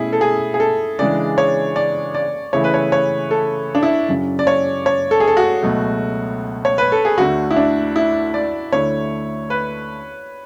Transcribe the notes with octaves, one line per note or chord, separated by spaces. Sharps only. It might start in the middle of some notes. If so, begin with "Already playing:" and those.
Already playing: B2 A3 C#4 E4 G#4
A4
G#4
G#4
A4
C#3 E3 G#3 D4 D5
C#5
D5
D5
C#3 E3 A3 E4 C#5
B4
C#5
C#5
A4
D4
E4
F#2 C#3 F#3 C#4
D5
C#5
C#5
A4
G#4
A4
F#4
C#2 B2 F#3 A3
C#5
B4
A4
G#4
D2 D3 A3 F#4
E4
D4
E4
D5
D2 D3 A3 E4 C#5
B4